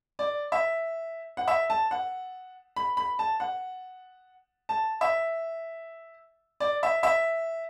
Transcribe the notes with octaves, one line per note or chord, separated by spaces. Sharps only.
D5
E5
F#5
E5
A5
F#5
B5
B5
A5
F#5
A5
E5
D5
E5
E5